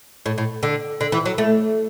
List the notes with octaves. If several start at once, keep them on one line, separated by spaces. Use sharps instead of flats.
A2
A2
D3
D3
E3
F#3
A3